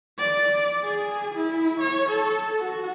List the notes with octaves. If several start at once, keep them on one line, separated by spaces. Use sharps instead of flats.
D5
G#4
E4
C#5
A4
F#4